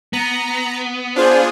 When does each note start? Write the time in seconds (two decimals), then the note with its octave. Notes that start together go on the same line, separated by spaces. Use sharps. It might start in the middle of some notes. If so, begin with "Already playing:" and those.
0.13 B3 A#5
1.16 D4 F4 G#4 C5